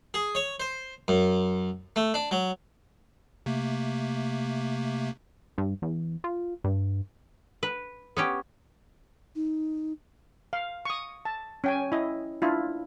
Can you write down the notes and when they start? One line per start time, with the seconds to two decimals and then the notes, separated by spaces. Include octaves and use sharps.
0.14 G#4
0.35 C#5
0.60 C5
1.08 F#2
1.96 A3
2.14 D4
2.31 F#3
3.46 C3 A3 A#3
5.58 G2
5.82 E2
6.24 F4
6.64 G2
7.63 B4
8.17 B3 C#4 G4
9.35 D#4
10.53 F5
10.85 C#6 D#6
11.25 A5
11.64 C#4 G5 G#5
11.92 E4 D#5
12.42 D4 E4 F4